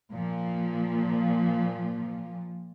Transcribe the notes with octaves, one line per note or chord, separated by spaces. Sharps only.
A#2 F3